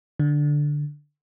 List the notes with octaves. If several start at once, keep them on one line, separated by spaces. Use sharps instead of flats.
D3